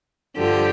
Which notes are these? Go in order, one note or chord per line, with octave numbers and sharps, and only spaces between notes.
G2 D3 F3 G4